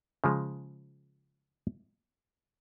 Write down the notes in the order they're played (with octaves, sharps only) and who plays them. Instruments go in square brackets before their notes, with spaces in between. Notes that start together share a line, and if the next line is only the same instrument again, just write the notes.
[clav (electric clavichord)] C#3 F3 G#3